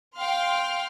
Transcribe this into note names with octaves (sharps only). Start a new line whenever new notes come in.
F5 G5 C6 F6